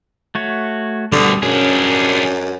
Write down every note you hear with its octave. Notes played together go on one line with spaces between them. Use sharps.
A3 F#4 C#5
D2 B2 D3 G3 D#6
F#2 C#4 D4 G#4